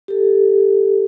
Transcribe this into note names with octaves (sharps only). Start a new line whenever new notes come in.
G4 A4